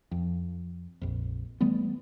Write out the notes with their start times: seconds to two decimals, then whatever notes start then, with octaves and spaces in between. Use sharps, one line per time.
0.11 F2
1.01 A#1 F2
1.61 E3 G3 A3 B3